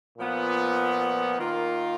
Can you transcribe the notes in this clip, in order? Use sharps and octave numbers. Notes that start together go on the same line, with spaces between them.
A#2 F3 B3 F4
D#3 A#3 F4